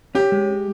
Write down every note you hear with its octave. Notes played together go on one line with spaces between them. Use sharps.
C#4 G4
G#3